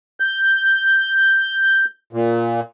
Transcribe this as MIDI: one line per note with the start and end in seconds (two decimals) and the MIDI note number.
0.20 1.85 91
2.13 2.60 46